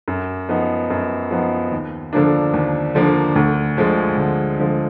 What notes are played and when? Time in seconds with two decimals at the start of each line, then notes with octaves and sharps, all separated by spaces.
0.08 F#2
0.49 F3 B3 D#4
0.90 F#2
1.31 F3 B3 D#4
1.72 D#2
2.13 D3 F3 A#3 D4
2.54 D#2
2.95 D3 F3 A#3 D4
3.36 D2
3.77 D3 F3 G#3
4.18 D2
4.59 D3 F3 G#3